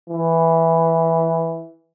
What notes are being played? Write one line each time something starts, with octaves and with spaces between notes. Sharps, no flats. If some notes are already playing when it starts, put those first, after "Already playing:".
E3